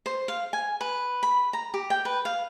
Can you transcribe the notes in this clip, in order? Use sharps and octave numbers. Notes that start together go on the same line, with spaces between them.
C5
F5
G#5
B4
B5
A#5
G4
G5
B4
F5